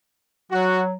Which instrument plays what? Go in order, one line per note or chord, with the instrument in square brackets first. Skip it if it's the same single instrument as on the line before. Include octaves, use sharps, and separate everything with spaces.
[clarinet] F#3 [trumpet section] F#4